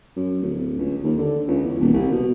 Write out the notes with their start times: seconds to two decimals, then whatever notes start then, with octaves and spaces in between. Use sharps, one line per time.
0.16 F#2
0.42 D1
0.78 C#2
1.03 D#2
1.18 D3
1.48 C#2
1.64 E2
1.80 D#1
1.93 C2
2.11 B2